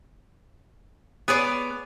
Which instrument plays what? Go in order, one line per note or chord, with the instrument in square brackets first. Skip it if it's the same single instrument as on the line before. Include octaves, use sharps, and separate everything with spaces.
[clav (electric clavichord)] B3 [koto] G#4 C#5 D5